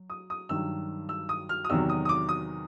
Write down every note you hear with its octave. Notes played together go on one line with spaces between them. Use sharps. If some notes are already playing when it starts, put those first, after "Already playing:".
Already playing: F#3
D#6
D#6
G2 D#3 F#3 E6
E6
D#6
F6
D#6
E2 C3 D#3 F#3 E6
D#6
D#6
D6
D#6